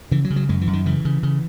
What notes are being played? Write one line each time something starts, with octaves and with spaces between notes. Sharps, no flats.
C#3 E3
F#3
C#3
F#3
F#2 G#3
E3
F#2
D#3
C#3 E3
C#3
C#3